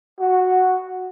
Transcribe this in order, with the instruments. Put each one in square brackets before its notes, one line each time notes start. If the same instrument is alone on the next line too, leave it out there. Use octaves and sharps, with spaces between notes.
[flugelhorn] F#4